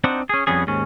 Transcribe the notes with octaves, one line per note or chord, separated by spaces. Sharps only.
C4 D4 D#4 C5 F#5
C#4 G#4
F2 G3 B3 C#4 G#4
D#2 G#2 C#4